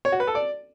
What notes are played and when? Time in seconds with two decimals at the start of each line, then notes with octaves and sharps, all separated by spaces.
0.05 C#5
0.12 F#4
0.20 B4
0.27 A4
0.35 D5